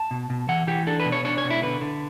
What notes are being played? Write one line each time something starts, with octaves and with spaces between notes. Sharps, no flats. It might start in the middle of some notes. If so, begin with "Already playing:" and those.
Already playing: A5
B2
B2
E3 F#5
E3 G4
D4 A4
B4
B2
C#5
D4 C#5
C#5
B2
E4
D3 B4
D3